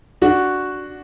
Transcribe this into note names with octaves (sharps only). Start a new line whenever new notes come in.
D4 F#4